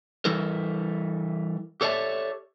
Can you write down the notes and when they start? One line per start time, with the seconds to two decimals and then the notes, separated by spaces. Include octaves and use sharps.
0.25 E3 G3 E4 A4 A#4
1.81 G4 A4 C#5 D5 E5 A5